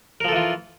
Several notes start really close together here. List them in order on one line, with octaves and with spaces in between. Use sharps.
A#4 F3 A4 E3 F4